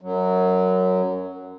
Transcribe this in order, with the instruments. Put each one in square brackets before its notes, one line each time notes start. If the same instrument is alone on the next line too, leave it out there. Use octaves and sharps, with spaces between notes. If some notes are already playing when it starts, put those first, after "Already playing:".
[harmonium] F#2 F#3